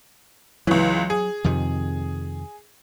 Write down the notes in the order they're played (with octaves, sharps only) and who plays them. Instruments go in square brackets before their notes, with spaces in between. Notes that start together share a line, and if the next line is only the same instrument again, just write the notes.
[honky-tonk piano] C#2 E3 [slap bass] F#3
[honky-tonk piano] G#4
[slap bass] F2 C3 D#3